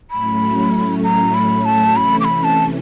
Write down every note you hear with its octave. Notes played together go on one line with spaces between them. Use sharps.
A2 F#3 A3 C#4 B5
A#5
B5
A5
C3 E3 A3 C#4 B5
D6
B5
A5